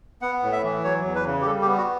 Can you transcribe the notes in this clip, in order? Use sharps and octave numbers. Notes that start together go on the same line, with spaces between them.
B3 F#5
A2
E5
E3
F#3 C#5
E2
B4
C#3
G4
G3 A4
G4
B3
F#4